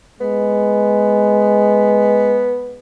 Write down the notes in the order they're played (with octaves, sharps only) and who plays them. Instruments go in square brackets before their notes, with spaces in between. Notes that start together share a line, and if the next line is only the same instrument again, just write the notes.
[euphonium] G#3 [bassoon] B3